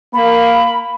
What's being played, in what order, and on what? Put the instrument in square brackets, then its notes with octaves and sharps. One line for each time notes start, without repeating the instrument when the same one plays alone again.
[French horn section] A#3 [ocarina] B5